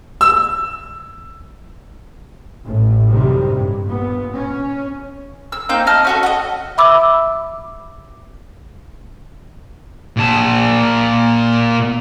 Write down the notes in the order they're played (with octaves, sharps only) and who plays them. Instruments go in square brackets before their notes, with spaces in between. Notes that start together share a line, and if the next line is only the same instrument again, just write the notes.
[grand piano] E6
[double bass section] A1 A2
F#2 A2 C3 D#3 G3
G2
A#2 B3
C#4
[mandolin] E6
A#3 C4 D#4 G6
D#5 A5 F6
C#4 F#4 A4
F#4 A4 D#5
[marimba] E5 B5 D6 E6
[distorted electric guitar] A#2 A5